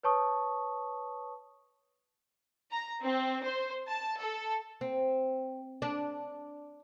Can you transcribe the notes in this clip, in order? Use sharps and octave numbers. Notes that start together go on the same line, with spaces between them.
B4 C#5 A5 C#6 D#6
A#5
C4
C5
A5
A4
C4
D4